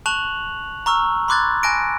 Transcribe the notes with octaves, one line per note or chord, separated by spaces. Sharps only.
A5 C#6 F#6 F7 F#7
A#5 C#6 E6 F6
B5 C6 D6 F#6 G#6 A6
G#5 A5 F#6 A#6 D7